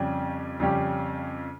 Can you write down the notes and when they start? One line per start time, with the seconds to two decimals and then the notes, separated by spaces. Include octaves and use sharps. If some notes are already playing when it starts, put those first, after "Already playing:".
Already playing: F2 C#3 G3 C#4 G4
0.60 F2 C#3 G3 C#4 G4